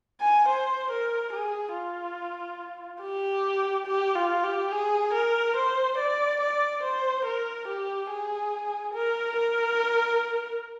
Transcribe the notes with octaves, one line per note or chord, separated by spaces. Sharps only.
G#5
C5
A#4
G#4
F4
G4
G4
F4
G4
G#4
A#4
C5
D5
D5
C5
A#4
G4
G#4
A#4
A#4